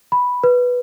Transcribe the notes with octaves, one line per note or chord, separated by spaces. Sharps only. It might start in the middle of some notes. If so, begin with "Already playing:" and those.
B5
B4